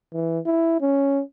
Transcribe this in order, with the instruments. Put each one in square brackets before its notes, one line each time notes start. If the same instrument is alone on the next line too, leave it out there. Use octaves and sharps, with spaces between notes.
[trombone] E3
E4
C#4